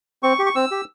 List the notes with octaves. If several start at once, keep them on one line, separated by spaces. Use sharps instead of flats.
C4 C#6
G4
C#6
C4 E6
G4